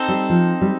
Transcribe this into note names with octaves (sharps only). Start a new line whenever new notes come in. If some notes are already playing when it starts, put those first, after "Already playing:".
Already playing: C4 D#4 A4 C5
G3
F3
G3